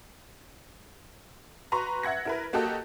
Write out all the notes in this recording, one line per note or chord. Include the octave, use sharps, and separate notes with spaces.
F#4 B4 A#5 C6 C#6
E5 F#5 G#6 A#6
E4 A#4 B4
A#3 F#4 G4 A4 D#5